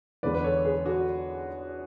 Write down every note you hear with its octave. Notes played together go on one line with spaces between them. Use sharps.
E2 D3 G#3 B3 B4 D5
B4
A4 C#5
G#4 B4
F#4 A4